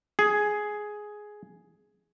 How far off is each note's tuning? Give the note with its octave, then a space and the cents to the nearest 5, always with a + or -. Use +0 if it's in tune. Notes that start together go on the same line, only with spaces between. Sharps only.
G#4 +10